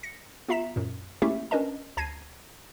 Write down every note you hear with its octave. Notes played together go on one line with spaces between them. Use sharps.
A#6 C#7
B3 F4 E5 A#5 B6 E7
F#2 A#2
A3 A#3 C#4 E4 G4 E5
C#4 D4 A#4 B4 D#5 A5
D2 A5 G#6 A#6 C7 D#7